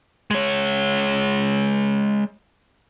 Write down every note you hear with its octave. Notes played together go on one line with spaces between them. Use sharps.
G#3 C#5